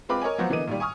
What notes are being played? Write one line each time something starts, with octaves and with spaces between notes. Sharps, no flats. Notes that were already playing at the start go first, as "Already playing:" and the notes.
G#3 C4 F4 B4 B5 D6
A#4 C#5 D#5 G#5
F3 F#3 B3 C5 F#5
D3 E3 A#3 B3 D#5 D#7
A#2 D#3 G3
G#5 C#6 D#6 F6